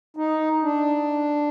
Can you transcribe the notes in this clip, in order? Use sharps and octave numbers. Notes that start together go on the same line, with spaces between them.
D#4
D4